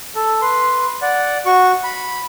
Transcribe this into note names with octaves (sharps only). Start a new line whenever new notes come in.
A4
B4 C6
D5 F#5
F#4 C#6
B5